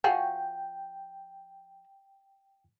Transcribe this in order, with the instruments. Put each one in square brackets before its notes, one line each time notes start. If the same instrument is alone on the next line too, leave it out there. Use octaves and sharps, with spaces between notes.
[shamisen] F3 F#4 G#4 [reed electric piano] G5